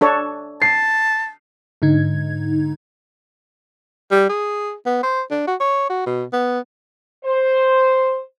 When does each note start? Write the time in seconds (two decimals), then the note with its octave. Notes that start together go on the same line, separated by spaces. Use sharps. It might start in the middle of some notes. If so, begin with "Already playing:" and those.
0.01 D4 A4 C#5
0.62 A5 C7
1.82 G#2 D3 D#4 G#6
4.11 G3
4.29 G#4
4.86 B3
5.03 C5
5.31 D4
5.47 F#4
5.60 C#5
5.89 F#4
6.06 B2
6.33 B3
7.25 C5